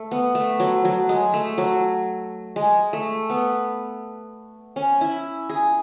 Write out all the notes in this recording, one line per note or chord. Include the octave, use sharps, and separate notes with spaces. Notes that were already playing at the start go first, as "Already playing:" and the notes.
Already playing: A3
B3
A3
F#3
F#3
G#3
A3
F#3
G#3
A3
B3
C#4
E4
G#4